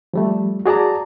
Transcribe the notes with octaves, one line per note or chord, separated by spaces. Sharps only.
F3 G3 A3
F#4 G#4 D5 A5 A#5